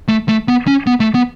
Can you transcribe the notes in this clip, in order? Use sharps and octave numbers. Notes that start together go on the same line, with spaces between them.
A3
A3
B3
C#4
B3
A3
B3